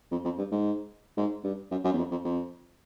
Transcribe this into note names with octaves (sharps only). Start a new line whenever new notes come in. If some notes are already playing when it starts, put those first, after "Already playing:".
F2
F2
G2
G#2
G#2
G2
F#2
F#2
E2
F2
F2
F2